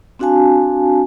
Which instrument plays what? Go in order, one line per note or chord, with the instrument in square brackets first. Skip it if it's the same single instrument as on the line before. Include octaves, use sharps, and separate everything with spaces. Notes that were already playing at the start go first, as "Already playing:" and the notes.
[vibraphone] C4 D4 F#4 F5 G#5 A5